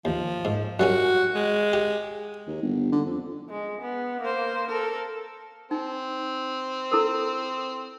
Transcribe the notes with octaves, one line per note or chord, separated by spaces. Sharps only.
D#2 F3
G#2
F#2 G3 C#4 F#4
G#3
G4 F#5
D#2
G1
D3
F2
G#3
B3
A#3 C5
A4 A#4
C4 D#4 G#5
E4 A4 A#4